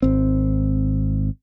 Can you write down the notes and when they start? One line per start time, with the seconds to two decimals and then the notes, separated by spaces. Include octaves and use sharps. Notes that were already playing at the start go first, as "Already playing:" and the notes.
0.02 G#1 C4